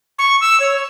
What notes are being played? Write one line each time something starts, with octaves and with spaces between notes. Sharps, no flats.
C#6
E6
C#5